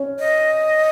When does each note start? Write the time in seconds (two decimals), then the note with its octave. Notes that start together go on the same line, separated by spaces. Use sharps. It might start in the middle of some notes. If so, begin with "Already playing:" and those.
Already playing: C#4
0.19 D#5